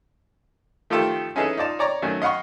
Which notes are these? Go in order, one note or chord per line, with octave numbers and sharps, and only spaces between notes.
D#3 F3 A3 F4 G4 A4
C#4 D#4 E4 G#4 A4 B4
D#4 F4 D5 A5
C#5 D5 A#5 C#6
D#3 F#3 A3 C#4
D#5 F5 F#5 B5 C#6